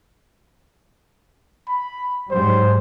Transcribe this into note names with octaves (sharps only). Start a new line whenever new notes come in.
B5
G#2 F#3 G3 C5